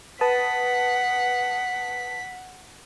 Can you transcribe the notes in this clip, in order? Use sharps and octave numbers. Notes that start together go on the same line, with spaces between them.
B4 F#5 A5 D#6 B6